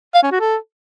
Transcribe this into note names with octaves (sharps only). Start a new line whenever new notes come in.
F5
C#4
F#4
A4